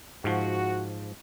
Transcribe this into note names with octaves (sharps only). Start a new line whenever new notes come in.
G#2 F3 F#4